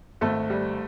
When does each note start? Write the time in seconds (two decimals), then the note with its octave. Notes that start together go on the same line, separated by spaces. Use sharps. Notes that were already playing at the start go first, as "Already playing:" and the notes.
0.21 G#1 A3 A4
0.50 G3